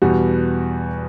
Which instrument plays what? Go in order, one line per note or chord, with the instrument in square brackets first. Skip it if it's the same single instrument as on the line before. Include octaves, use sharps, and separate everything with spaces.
[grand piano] E2 B2 G3 F#4